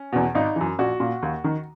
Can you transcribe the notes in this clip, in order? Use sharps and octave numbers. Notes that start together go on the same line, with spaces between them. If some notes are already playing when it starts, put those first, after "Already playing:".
Already playing: C#4
E2 B2
G#1 D#4
F#2 E3
A#1 F#4
A#2
D#2
D#3